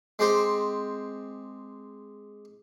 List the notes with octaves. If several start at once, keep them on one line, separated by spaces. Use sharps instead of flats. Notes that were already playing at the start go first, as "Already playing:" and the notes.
G#3 C4 G4 C5